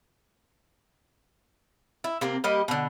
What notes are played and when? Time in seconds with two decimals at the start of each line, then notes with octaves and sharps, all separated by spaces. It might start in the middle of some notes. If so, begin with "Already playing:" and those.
2.04 E4
2.21 C3 A#3 C4
2.44 G3 A#3 G4 D#5
2.68 B2 D3